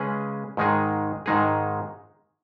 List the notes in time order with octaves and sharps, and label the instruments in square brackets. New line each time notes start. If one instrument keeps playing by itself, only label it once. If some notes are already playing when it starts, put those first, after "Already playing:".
Already playing: [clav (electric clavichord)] C#3 G#3 C#4 G#4 B4
G#2 D#3 G#3 D#4 G#4
G#2 D#3 G#3 D#4 G#4